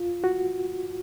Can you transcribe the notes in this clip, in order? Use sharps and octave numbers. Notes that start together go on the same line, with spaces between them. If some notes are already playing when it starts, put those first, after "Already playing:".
Already playing: F4
F#4